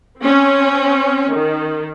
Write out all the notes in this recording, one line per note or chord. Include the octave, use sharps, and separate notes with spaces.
C4 C#4
D#3